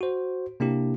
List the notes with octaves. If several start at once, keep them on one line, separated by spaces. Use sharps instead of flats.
F#4 C5
C3 A#3 D4 E4 G4